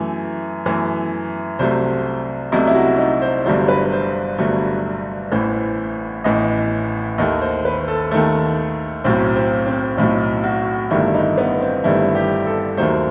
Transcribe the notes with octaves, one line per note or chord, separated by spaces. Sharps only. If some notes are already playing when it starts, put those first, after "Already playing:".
Already playing: F#2 E3 A3
F#2 E3 A3
C2 C3 F#3 A3 C5
C2 C3 F#3 A3 D#5
E4
F#4
D#4
C5
G1 G2 F#3 A3 C5
B4
C5
G1 G2 F#3 A3
A1 A2 E3 C5
A1 A2 E3 D#5
D#2 D#3 A3 D#5
C5
B4
A4
D#2 D#3 A3 A4
B1 A2 F#3 C4
C4
C4
B1 A2 F#3 D#4
F#4
G1 G2 D#3 A3 E4
D#4
B3
C4
G1 G2 D#3 A3 E4
G4
A4
D#2 D#3 F#3 A3 C5